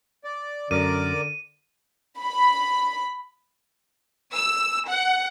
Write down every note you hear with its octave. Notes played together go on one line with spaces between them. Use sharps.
D5
F#2 D3 A#4 D5 D6 D#7
B5
E6
F#5